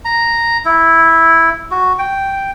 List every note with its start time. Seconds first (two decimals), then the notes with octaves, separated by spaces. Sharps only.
0.05 A#5
0.65 E4
1.71 F#4
1.99 G5